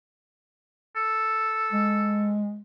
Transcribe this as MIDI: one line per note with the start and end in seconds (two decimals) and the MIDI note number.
0.96 2.35 69
1.72 2.62 56